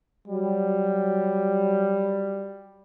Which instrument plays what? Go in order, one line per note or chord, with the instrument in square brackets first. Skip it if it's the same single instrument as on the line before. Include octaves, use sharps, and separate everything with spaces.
[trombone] F#3 [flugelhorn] G3